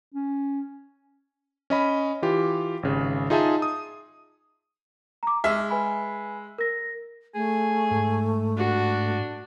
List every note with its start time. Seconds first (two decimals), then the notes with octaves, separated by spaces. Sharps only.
0.14 C#4
1.70 C#4 D#5 B5
2.22 E3 F4 G4
2.83 G#1 C#3
3.30 D#4 F4 G#4 D#5 E5 A5
3.62 D#6
5.23 A#5 D6
5.44 G#3 G#4 E5 F6
5.70 B4 G#5 B5
6.58 A#4 A#6
7.35 A3 G#4
7.91 G#2
8.57 D4 F#4